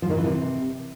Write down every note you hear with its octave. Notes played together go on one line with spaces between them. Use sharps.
F3
D#3
E3
C3